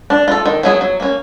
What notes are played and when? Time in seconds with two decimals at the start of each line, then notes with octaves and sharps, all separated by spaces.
0.10 D4
0.28 F4 A4
0.46 D#3
0.63 F#3 B3 E4 G#4
0.81 F#3
1.00 A#3 C#4